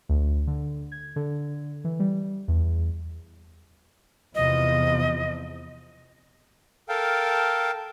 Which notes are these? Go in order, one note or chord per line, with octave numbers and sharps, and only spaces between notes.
D2
D3
G#6
D3
E3
G3
E2
E2 C3 F3 D#5
A4 A#4 F5 G5 A5